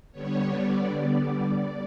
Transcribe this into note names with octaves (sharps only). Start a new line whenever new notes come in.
D3 G3 B3 C#5
D5
D5